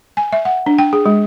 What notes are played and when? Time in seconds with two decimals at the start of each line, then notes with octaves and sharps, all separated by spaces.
0.17 G#5
0.32 E5
0.45 F#5
0.66 D4
0.78 G5
0.93 G#4
1.06 G#3